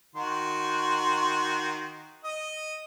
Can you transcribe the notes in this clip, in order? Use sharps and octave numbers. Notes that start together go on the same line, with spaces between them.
D#3 F#4 C6
D#5